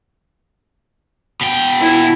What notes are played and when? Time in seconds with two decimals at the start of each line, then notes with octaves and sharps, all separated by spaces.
1.41 B2 G5
1.81 E4